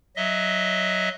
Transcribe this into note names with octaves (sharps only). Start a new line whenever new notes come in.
F#3 D#5 E5